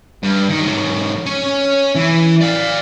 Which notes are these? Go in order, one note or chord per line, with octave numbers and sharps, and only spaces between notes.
G2
D#3
G#2 F#3
C#4 C#5
E3
D5 F5